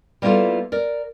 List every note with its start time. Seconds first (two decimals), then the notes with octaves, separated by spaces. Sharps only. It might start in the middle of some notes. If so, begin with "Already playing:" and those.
0.22 G3 A#3 B3 E4 F4 A4
0.72 A#4 D5